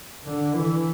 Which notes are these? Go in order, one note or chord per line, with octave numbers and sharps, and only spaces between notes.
D3
E3